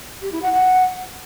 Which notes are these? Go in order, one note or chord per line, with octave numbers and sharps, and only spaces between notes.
G4
E4
F#5
F#5